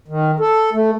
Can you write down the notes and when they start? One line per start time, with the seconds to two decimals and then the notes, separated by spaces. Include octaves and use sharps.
0.08 D#3
0.40 A4
0.73 A3